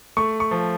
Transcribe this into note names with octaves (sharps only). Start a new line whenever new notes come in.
A3 C#6
C#6
F3